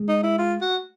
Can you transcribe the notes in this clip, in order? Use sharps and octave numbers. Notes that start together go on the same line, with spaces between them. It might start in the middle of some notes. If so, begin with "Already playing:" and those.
Already playing: G#3
D#4
E4
F4
F#4